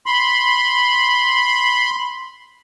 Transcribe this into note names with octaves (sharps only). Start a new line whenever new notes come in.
B5 C6